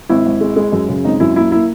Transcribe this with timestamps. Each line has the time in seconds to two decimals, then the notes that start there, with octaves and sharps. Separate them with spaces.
0.09 G#1 E4
0.26 G#1
0.41 G#3
0.56 G#3
0.72 F#2
0.89 C#3
1.04 G#1 D#4
1.20 F#2 E4
1.36 A#3 E4
1.52 A#3 E4